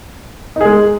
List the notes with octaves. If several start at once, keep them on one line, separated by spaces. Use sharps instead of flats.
G#3 D#4 G#4